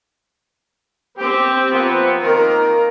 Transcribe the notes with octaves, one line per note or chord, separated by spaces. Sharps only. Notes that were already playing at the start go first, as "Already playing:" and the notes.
C4 G4
F3 A#3 B3
D#3 A#3 F4 A#4